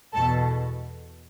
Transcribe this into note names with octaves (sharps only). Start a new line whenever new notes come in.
E2 B2 A4 A5